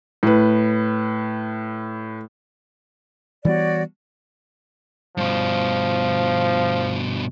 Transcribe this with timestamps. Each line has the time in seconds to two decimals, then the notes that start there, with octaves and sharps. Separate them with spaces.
0.23 A2 B4
3.45 E3 G3 B3 F#4 C#5 D5
5.17 G2 B2 F3